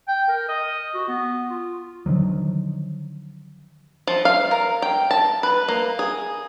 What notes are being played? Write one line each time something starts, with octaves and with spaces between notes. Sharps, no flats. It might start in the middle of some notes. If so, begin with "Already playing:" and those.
G5
A#4
D#5
F#4
B3
F4
D3 D#3 F3 F#3
F3
F5
A#4
G5
A5
B4
A#3
G#4